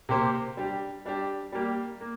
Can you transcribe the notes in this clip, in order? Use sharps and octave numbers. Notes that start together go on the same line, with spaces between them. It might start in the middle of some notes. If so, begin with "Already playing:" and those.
C3 A#3 G4 C5
G3 D4 G4
G3 D4 G4
G3 A#3 G4
A#3